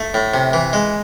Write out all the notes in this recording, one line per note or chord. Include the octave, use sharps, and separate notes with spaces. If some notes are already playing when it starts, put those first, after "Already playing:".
Already playing: A3
A2
C3
E3
G#3